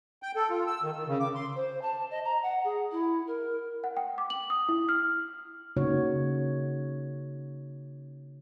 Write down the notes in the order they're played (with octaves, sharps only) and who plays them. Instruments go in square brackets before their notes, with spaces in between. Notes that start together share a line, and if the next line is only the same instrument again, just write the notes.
[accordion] G5
A4
F4
E6
D#3
D#3
C#3
D6
C6
[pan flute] C5
A5
D#5
A#5
F#5
G#4
E4
A#4
[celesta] F#5
G5
D6
F#7
D#6
E4
F6
[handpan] C#3 A#3 D#4 F#4 C#5